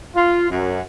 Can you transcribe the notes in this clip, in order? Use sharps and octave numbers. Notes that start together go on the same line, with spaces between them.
F4
F#2